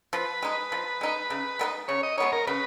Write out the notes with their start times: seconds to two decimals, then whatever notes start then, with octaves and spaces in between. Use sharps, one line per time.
0.13 F3 B4
0.42 G#3 D#4
0.72 F3
1.01 G#3 D#4
1.30 C#3
1.59 G#3 B3 D#4
1.88 C#3 C#5
2.03 D#5
2.18 G#3 B3 D#4 C#5
2.32 A#4
2.47 C#3 B4